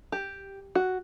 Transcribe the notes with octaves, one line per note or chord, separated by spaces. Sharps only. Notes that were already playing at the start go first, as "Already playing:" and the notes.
G4
F#4